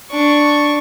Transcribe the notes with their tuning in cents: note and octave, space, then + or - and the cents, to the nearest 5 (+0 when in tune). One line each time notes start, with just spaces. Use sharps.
D4 +0 C#6 +0